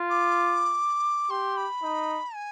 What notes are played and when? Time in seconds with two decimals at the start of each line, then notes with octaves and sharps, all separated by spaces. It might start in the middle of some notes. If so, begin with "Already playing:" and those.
Already playing: F4
0.10 D6
1.30 G4 C6
1.57 B5
1.83 D#4
2.35 G#5